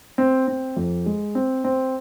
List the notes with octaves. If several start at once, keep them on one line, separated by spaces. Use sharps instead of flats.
C4
C4
F2
G#3
C4
C4